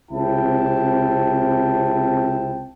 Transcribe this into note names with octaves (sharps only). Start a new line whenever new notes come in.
C#2 C3 C4 E4 G5 A5